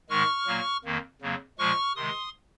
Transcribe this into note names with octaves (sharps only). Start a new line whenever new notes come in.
G#2 D#3 G#3 C#6 F6
A#2 F#3 A#3
F2 D#3 A#3
F2 C#3 F#3 A#3
A#2 F3 G#3 C#6 F6
C3 D#3 G#3 C6 D#6